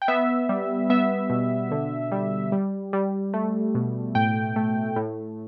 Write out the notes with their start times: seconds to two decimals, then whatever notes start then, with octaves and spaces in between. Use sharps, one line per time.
0.02 G5
0.08 B3 E5
0.49 G3
0.90 B3 E5
1.30 B2
1.71 D3
2.12 G3
2.52 G3
2.93 G3
3.34 A3
3.75 B2
4.15 A2 G5
4.56 A3
4.96 A2